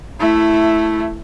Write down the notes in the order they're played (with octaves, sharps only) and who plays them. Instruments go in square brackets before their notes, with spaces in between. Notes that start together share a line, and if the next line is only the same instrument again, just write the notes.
[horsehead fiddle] A3 E4